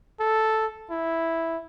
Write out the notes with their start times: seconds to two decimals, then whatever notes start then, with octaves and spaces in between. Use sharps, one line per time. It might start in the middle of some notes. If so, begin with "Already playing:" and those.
0.20 A4
0.90 E4